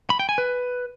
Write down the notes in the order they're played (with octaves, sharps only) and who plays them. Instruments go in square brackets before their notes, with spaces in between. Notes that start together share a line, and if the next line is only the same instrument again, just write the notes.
[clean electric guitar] B5
G5
G#5
B4